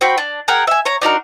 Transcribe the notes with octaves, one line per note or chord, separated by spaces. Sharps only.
C4 F#4 G5 B5
D4
G#4 A#4 F#5 G5
E5 G#5
C#5 A#5
D4 D#4 F#4 A#4